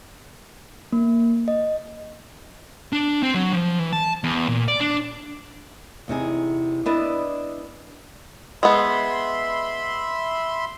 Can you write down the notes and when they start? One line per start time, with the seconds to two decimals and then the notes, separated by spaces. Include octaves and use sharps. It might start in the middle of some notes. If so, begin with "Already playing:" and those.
0.93 A#3
1.48 D#5
2.93 D4
3.23 C4
3.34 F#3
3.53 F3
3.79 E3
3.93 A5
4.24 E2
4.49 A#2
4.68 D5
4.80 D4
6.08 E2 C3 D#4 G#4
6.86 B3 D4 E4 B4 D5 D#5
8.63 G#3 B3 E5 B5 C6